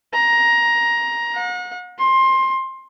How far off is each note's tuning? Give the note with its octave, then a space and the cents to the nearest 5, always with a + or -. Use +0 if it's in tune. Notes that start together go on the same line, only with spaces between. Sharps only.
A#5 +15
F#5 -40
C6 +20